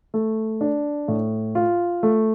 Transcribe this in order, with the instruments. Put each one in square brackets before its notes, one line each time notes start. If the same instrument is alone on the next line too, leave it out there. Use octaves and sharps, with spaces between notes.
[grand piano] A3
D4
A2
F4
A3